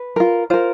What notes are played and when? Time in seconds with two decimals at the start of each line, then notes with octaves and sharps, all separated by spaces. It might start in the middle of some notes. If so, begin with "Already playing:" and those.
Already playing: B4
0.16 F4 A#4
0.50 F4 A#4 C5